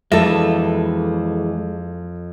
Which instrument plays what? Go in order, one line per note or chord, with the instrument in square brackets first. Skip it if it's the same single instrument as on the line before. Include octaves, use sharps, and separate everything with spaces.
[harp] F2 F4 A#6 [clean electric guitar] E3 G#3 [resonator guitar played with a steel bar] A4 E5